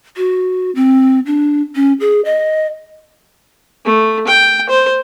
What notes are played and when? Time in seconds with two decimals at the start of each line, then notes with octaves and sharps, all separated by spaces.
0.17 F#4
0.75 C4
1.26 D4
1.75 C#4
2.00 G#4
2.25 D#5
3.85 A3
4.28 G5
4.70 C5